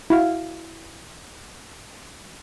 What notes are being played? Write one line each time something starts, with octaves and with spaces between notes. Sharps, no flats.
E4 F#4 F5